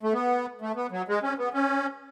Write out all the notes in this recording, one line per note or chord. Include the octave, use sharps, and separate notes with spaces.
A3
B3
A3
B3
F#3
G#3
C#4
B3
C#4